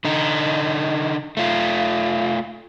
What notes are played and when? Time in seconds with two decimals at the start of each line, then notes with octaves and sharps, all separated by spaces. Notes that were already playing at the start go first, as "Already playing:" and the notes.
0.05 D3 D#4
1.37 A3 F4